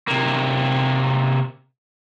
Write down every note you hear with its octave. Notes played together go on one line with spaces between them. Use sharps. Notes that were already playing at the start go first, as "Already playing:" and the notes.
C3 A#3